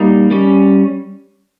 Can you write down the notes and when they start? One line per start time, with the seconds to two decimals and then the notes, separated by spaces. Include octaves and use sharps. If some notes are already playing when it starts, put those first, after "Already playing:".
Already playing: G3 A#3 D#4
0.31 G3 C#4